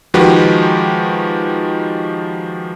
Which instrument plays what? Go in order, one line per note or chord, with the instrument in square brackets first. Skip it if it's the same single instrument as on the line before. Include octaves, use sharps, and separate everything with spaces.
[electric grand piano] D#3 F3 G#3 F#4 G4 B4